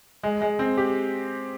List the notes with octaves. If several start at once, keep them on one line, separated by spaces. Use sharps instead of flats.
G#3
G#3
C4
G4